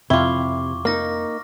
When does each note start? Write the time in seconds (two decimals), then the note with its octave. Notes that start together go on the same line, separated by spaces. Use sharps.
0.10 F2 C3 E4 F4 C#6 D6
0.85 A#3 D#4 F6 A#6